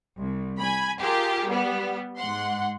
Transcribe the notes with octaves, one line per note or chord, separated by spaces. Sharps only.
C2
G#5 B5
F4 G4 G#4 A#4
G3 B3
G#2 F#5 C6